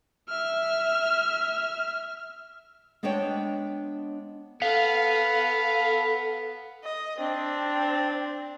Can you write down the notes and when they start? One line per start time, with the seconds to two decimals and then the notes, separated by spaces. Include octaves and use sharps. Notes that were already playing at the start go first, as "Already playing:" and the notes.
0.29 E5 F6
3.03 G#3 B3 D4 C5 C#5 G5
4.62 B3 A4 F5
6.84 D#5
7.18 C4 D4